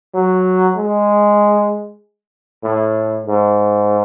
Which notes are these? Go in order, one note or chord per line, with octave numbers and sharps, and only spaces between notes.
F#3
G#3
A2
G#2